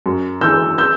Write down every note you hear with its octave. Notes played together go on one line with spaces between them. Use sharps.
F#2
E3 E6 G6
E6 G6